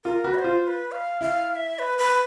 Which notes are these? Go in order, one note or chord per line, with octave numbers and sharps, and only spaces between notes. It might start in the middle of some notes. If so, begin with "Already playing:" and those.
F4 A#4
F#4 B4
E5
C5
F4
C5
B4
F5
E4 F5
F5
E5
B4
B4